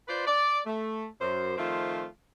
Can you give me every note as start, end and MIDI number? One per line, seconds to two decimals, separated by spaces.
0.08 0.23 65
0.08 0.23 71
0.08 0.23 72
0.08 0.23 74
0.27 0.60 74
0.67 1.06 57
1.20 1.57 42
1.20 1.57 72
1.57 2.06 51
1.57 2.06 53
1.57 2.06 57
1.57 2.06 60
1.57 2.06 65
1.57 2.06 72